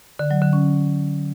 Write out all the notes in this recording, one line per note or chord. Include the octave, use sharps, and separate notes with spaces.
D3
F#3
D3
C#4